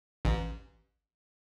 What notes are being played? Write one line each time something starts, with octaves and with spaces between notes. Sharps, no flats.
A1